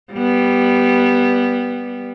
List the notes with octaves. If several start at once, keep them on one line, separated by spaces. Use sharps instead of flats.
G3 B3